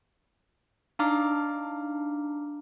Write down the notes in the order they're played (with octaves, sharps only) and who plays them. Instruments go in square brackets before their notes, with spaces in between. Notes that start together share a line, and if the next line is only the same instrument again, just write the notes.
[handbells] D4 D#4 F5 A#5 D6 F6